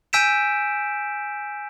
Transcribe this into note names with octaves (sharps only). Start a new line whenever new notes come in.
G#5 E6 G6 B6 D7 E7